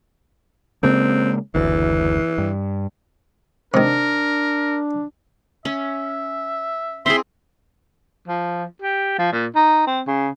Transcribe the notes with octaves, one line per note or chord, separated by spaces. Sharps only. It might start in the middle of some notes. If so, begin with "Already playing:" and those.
C#3 G#3 A#3 C4
F#1 D2 E3
G2
C3 D#3 D4 A#4
C#4 E5
C4 E4 G#4 E5 C6
F3
G4
F3
A#2
D#4
C4
C#3